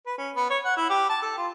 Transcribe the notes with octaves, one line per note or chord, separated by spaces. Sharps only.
B4
C#4
B3
C#5
F#5
E4
G4
A5
A4
F4